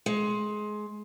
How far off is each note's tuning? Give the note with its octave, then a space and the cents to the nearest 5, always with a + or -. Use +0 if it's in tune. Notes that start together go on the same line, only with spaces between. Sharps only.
G#3 +20